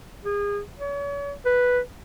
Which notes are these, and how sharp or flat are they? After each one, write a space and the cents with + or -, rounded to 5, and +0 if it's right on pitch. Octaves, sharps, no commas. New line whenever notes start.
G#4 -30
C#5 +40
B4 +0